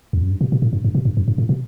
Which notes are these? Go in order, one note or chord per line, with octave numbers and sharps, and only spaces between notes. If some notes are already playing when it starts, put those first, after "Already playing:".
E2
F#2
G2
B2
B2
A2
G2
G2
B2
G2
F#2
G2
A2
B2